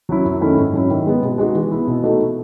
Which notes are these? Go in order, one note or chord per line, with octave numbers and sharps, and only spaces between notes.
F#3 C#4 E4
F#2
D#3 A3 C#4 E4
G#2
F#3 C#4 E4
D#3
G#3 B3
B2
G#3 D#4 F#4
E3
B3 E4
B2
A3 D#4 F#4